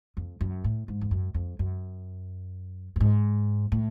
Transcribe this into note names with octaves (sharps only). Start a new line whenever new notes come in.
F2
F#2
A2
G#2
F2
F#2
F2
F#2
G2
G#2
A2